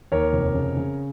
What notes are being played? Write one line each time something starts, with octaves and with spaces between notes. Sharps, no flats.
D#2 A#4 C#5
F1
C#3
C#3